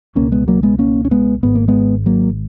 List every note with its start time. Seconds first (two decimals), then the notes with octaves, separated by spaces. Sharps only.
0.15 C#2 B2 A#3 C#4
0.32 G#3 B3
0.48 F#3 A#3
0.63 G#3 B3
0.79 A#3 C#4
1.05 C#4
1.11 G#3 B3
1.43 G#1 G#2 B3
1.55 A#3
1.68 G#3 B3
2.06 F#3 A#3